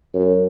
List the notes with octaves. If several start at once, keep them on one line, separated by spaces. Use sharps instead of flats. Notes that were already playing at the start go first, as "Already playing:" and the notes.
F#2